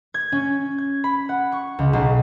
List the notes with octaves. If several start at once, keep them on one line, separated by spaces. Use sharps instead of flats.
G#6
C#4
G#6
B5
F#5
C#6
C#2
B1